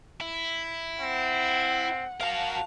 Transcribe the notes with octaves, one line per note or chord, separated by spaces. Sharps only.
E4
C4 F#5
F#4 A#4 F5 A5 F7